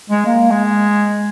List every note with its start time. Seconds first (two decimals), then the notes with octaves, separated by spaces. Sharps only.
0.10 G#3
0.27 A#3
0.51 G#3